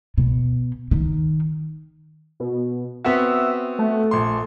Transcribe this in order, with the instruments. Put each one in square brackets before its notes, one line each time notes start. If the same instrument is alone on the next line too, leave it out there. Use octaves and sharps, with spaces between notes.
[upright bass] B2
D#3
[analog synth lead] B2
[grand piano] B3 C4 F#4 [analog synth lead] E5
[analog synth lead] A3
[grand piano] A#1 C6